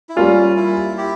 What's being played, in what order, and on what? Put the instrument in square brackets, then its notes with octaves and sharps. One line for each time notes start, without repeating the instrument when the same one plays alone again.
[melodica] E4
[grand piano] G3 A#3 F4 [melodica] C#4
[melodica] E4
E4 G4